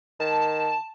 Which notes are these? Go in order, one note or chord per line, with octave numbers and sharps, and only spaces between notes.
D#3 A5